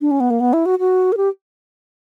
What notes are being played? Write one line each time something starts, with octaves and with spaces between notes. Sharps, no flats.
D4
C#4
B3
A#3
B3
E4
F#4
F#4
A#4
G4